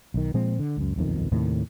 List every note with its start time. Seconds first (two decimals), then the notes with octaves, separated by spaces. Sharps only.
0.14 B1 D#3
0.34 A#2 F3 G#3 C4
0.59 D3
0.77 C#2 F#2
0.96 D#1 B1 F2 D#3
1.32 D#2 A2 C3 D#3